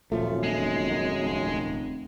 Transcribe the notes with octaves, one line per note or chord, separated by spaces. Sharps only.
D#1 F#2 A#2 F3 A3
F1 G#3
F1